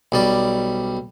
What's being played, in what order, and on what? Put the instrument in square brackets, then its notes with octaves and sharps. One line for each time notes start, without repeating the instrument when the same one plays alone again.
[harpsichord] B1 G3 D5